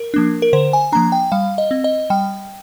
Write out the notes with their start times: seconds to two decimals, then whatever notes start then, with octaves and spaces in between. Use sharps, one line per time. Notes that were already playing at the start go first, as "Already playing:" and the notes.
Already playing: A#4
0.14 F3 A#3 D4
0.42 A#4
0.53 D3 C5
0.73 G#5
0.92 F3 A#3 D4 A#5
1.12 G5
1.32 G3 F5
1.58 D#5
1.71 C4
1.84 D#5
2.10 G3 G5